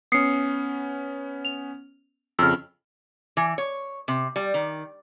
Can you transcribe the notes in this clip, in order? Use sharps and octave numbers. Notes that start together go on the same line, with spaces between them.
B3 C#4 D#6 C7 C#7
F7
F2 C#3 E6 F6
E3
C#5
C3
G3
D#3